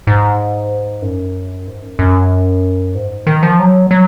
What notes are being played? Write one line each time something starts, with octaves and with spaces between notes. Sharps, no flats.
G#2
F#2
G#2
F#2
F#2
G#2
D#3
F3
F#3
F#3